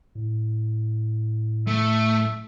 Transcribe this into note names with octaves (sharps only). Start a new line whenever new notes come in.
A2
A3 E5